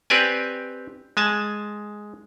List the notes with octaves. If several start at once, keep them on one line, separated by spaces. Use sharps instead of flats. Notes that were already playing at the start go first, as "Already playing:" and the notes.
C4 G4 B4 D5 G#5
G#3 G#5 A5